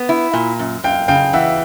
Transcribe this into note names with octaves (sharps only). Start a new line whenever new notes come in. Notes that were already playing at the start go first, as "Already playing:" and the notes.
Already playing: B3
E4
A#2
F#2
F#2 F5 G5
C#3 F5 G5
E3 E5 F#5